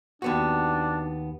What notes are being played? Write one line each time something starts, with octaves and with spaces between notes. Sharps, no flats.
D#2 B3 D4 F#4